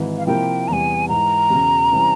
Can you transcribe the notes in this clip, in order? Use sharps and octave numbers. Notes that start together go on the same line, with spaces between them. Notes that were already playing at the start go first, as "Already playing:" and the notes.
Already playing: G#1 G#2 E3
F5
C3 F3 A#3 E4 A#4 G5
E2 C3 E3 G3 G#5 A#5
G#2 E3 G#3 A#5
E1 E2 C#3
C3 E3 G3 C#4